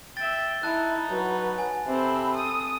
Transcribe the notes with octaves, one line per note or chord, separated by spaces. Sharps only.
E5 G5 A6
D#4 E4 A5 F#6
F#3 B4 F#5
G#5
C3 C4 A4 C5 B5
D#6